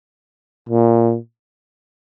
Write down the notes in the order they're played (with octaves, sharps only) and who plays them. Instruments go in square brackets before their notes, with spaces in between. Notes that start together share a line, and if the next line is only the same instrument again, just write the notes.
[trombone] A#2